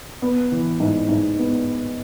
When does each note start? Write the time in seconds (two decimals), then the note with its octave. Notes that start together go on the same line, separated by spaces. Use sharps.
0.22 B3
0.52 E3
0.80 G#2
1.09 G#2
1.39 B3